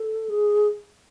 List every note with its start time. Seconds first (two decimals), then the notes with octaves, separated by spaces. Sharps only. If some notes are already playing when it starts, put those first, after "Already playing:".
Already playing: A4
0.29 G#4